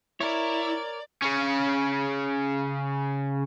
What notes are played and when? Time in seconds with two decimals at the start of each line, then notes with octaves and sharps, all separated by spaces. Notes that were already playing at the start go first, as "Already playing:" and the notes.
0.20 E4 A#4 C#5 D5
1.22 C#3 C#4